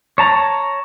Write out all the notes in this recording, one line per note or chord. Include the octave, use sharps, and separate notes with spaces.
C#5 A5 A#5